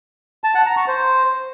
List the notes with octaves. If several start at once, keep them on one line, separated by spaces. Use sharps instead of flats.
A5
F#5
A#5
C#6
C5